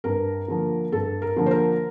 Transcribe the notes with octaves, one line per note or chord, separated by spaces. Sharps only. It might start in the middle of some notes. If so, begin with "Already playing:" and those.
G2 A#4
D3 F3 A#3
G2 A4
A#4
D3 F3 A#3
C5
A#4